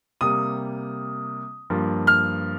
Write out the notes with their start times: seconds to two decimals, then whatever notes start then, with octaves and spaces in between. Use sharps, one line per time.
0.21 C3 G3 A#3 D#6
1.70 G2 F3 A#3
2.07 F6